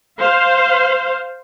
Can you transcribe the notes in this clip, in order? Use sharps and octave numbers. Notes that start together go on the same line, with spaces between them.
C5 F5